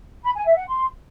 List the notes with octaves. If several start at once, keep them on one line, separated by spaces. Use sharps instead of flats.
B5
G#5
E5
F#5
C6